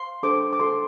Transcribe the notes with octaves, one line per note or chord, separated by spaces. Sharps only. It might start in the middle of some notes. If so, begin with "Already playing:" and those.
Already playing: C6
D4 A4 C5 D6
D6
F#4 A4 C5 C6